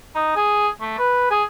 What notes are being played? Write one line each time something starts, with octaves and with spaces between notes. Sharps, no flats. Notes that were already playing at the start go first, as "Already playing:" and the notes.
D#4
G#4
A3
B4
G#4